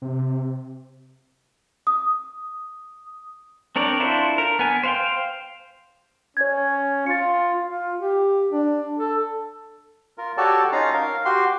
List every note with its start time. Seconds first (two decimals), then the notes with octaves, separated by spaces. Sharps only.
0.02 C3
1.87 D#6
3.76 C4 D4 A#4 C#5 D5
4.00 D4 E4 F4 A4 C5
4.38 A#4
4.59 B3 G#5
4.83 C5 F5 G5
6.37 C#4 C#5 G#6
7.06 F4 A6 C#7
7.66 F4
7.99 G4
8.52 D4
8.99 A4
10.18 F4 A#4
10.37 F#4 G4 A4 C#5 D5 A5
10.72 C#4 D#4 F4 F5 A#5
10.94 A#4 F5
11.25 F#4 G4 C6